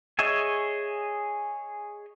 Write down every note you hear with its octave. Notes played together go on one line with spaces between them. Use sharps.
G#4 C#5 D#5 E5 G#5